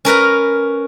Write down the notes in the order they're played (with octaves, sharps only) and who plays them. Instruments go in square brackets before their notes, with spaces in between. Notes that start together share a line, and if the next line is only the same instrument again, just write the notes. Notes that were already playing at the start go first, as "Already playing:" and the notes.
[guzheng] C#4 A#4 B4 A#5